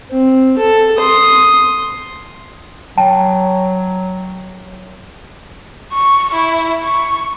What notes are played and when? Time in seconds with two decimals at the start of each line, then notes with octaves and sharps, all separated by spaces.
0.11 C4
0.58 A4
0.98 C6 D#6
2.97 F#3 G5 A5
5.92 C#6
6.33 E4
6.82 C#6